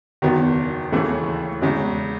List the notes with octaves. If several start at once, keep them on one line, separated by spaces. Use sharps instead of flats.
F#1 E2 D#3 F#3 B3
D#2 C#3 E3 A3
E2 C#3 G#3